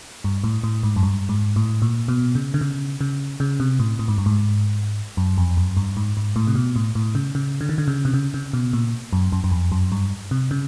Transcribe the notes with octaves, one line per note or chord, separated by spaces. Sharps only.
G2
A2
A2
G#2
F#2
G2
G#2
A2
A#2
B2
C#3
D3
C#3
C#3
C#3
C3
A2
A2
G#2
G2
G#2
F#2
F2
F#2
G2
G#2
G#2
A2
C3
B2
A2
A2
C#3
C#3
D3
D#3
D3
C#3
C3
C#3
C#3
B2
A#2
F#2
F#2
F#2
F2
F#2
G2
C3
C#3